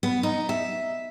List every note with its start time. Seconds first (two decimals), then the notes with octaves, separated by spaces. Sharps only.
0.03 B3
0.23 D#4
0.49 E5